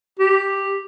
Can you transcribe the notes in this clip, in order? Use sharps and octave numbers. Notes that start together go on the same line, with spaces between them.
G4